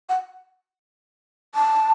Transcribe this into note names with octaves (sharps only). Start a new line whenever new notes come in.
F#5
A5